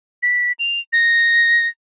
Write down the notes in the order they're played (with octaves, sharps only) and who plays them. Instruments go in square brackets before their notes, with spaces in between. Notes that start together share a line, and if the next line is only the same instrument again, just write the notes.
[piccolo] B6
F7
A#6